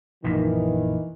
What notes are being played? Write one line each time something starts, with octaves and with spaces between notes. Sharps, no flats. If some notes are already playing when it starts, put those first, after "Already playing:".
A#1 F#2 A#2 D#3 E3